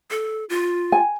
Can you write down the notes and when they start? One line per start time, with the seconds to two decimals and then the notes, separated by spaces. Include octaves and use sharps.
0.11 A4
0.49 F4
0.92 G#5